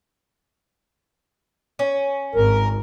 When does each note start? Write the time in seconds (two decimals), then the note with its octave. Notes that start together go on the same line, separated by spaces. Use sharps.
1.79 C#4
2.35 G#1 A#4